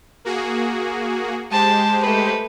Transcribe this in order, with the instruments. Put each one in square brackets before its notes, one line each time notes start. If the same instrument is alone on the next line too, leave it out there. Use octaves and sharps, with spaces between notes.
[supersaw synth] A#3 F#4 G#4
[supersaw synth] G#3 G4 C5 [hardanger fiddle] A5
[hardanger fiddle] A3 B4